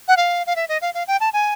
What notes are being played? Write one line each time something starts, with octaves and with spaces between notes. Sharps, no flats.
F#5
F5
F5
E5
D#5
F5
F5
G5
A5
G#5